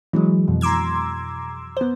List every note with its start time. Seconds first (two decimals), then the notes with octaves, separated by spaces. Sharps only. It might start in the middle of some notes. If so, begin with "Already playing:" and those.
0.13 E3 F#3 G#3
0.48 F2 B2
0.61 A#5 C6 D6 E6 G#6
1.77 B3 C5